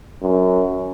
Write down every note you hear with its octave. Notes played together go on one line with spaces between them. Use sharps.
F#2